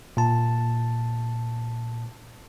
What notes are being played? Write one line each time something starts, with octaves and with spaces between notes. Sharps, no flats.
A#2 A5